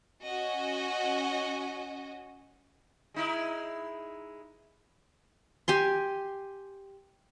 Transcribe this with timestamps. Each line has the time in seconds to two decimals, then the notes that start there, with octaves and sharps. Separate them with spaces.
0.24 C#4 F#4 D#5 G#5
3.14 G#3 D#4 E4
5.68 G4 G#5 C6